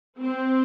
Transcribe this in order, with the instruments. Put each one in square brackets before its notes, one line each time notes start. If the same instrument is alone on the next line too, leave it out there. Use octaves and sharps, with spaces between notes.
[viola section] C4